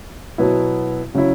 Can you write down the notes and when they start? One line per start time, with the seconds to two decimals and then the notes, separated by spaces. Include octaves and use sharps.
0.38 B2 F#3 B3 E4
1.14 C#3 F#3 C#4 E4